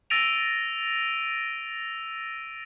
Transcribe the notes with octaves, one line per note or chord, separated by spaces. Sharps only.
E6 A6 A#6 D7 D#7 F7